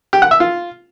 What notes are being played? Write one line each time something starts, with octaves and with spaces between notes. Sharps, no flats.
G4
F#5
E5
F4